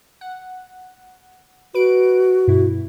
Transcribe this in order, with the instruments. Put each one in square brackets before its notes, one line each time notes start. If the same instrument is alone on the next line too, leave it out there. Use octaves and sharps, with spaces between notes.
[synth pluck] F#5
[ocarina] F#4 [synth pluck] B4 D7
[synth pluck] G2 B2 E4